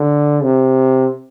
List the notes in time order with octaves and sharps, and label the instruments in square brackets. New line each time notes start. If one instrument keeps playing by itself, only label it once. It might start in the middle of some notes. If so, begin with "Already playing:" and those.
Already playing: [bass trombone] D3
C3